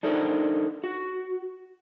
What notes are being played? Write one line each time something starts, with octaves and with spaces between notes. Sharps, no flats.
D4 D#4 A4 A#4 C5 D5
F#4